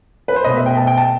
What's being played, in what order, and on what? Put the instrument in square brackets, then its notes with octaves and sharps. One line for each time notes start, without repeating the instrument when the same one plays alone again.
[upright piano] B4
C5
B2 A3 D#5
E5
G5
A5
G5
A5